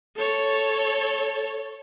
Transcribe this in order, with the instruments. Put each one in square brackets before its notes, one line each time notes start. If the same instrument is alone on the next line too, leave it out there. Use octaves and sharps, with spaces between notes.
[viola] A4 C#5